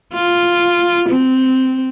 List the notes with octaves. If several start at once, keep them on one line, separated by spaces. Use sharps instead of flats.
F4
C4